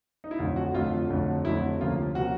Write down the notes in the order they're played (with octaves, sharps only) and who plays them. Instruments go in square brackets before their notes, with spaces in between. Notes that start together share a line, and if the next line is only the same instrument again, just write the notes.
[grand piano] D#4
E4
F2 D3 F#3 A3 F4
F#4
F2 D3 F#3 A3 F4
F2 D3 F#3 A3
F2 D3 F#3 A3 E4
D2 C3 F3 A#3 C#4 F4
C3 F3 A#3 C#4 F#4